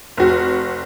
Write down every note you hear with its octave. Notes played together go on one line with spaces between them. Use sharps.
F1 F#4